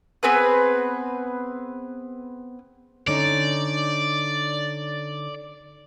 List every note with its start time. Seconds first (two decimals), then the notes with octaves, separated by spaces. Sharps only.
0.23 B3 C4 G#4 B4
3.08 D3 C#4 D#4 D5